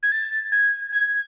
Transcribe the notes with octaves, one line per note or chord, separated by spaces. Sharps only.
G#6
A6
G#6
G#6